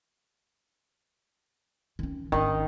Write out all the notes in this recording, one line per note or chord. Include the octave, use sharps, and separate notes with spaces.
D#3 C#4
G#1 D#3 C#4